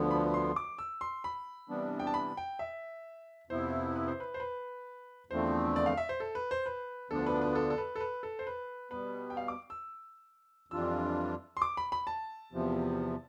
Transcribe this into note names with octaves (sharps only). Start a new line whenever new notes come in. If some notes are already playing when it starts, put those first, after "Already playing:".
Already playing: D2 D3 F3 B3
B5
C6
D6
E6
C6
B5
C3 E3 G3 B3 D4
G5
A5
B5
G5
E5
F2 C3 F3 B3 E4 C5
B4
C5
B4
C5
B4
E2 D3 F3 A3 C4 C5
D5
F5
E5
C5
A4
B4
C5
B4
D2 D3 F3 B3 D4 A4
B4
B4
A4
A4
B4
A4
B4
A4
C5
B4
B2 G3 B3 B4
G5
F5
D6
E6
F2 E3 G3 D4 F4 E6
C6
D6
B5
B5
A5
E2 C3 F3